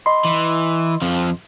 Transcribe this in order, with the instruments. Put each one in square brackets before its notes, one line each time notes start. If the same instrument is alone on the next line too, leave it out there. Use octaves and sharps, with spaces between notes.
[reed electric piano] D#5 B5 C6
[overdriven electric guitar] E3
F2 F3